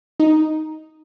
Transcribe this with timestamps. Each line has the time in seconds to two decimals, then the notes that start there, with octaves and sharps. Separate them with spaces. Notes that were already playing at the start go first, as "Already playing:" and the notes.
0.20 D#4